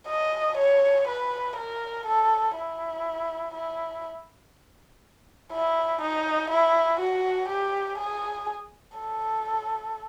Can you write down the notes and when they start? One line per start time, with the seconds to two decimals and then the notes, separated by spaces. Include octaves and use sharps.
0.08 D#5
0.57 C#5
1.07 B4
1.56 A#4
2.06 A4
2.55 E4
3.54 E4
5.52 E4
6.01 D#4
6.50 E4
7.00 F#4
7.48 G4
7.98 G#4
8.98 A4